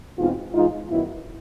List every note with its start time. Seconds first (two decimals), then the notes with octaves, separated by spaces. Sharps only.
0.18 E2 B2 G#3 C4 D#4 F4
0.53 G#2 E3 G#3 D#4 F4
0.89 F#2 D#3 F#3 B3 E4